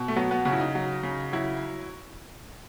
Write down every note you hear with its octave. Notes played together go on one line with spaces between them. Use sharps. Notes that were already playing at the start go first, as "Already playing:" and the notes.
Already playing: B2
A3
F#3 B3
B3
C#3 F#4
E4
D#4
F#3
C#3
F#3 E4